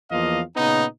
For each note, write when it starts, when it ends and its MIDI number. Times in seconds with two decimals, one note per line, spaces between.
0.12 0.41 40
0.12 0.41 53
0.12 0.41 58
0.12 0.41 65
0.12 0.41 75
0.12 0.41 77
0.57 0.85 46
0.57 0.85 49
0.57 0.85 59
0.57 0.85 63